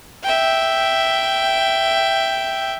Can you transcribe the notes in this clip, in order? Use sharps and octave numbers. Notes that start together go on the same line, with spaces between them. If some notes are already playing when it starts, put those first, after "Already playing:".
E5 G5